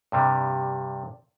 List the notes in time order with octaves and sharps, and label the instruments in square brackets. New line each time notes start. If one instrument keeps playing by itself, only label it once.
[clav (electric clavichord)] G2 C3 G3